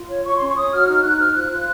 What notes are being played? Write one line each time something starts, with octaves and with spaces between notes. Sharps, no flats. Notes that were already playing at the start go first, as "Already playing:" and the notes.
Already playing: F4
C#5
C#5 C#6
C6
C#4 C#6
C#5 D#6
F#4 F6
D#4 F6
D#4 F#6
C5 F6
F4 F#6
F4